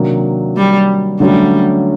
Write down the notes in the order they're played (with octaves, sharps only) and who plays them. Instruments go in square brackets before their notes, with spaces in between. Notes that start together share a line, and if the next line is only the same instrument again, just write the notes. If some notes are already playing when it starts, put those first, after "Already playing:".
Already playing: [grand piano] C3 D#3 F#3 A#3 D4
[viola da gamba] G3
[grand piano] D3 F#3 A3 C#4 [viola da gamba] G3